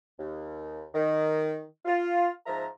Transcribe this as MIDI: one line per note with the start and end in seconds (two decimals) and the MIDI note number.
0.19 0.85 39
0.94 1.62 51
1.85 2.29 65
2.46 2.66 44
2.46 2.66 53
2.46 2.66 76
2.46 2.66 82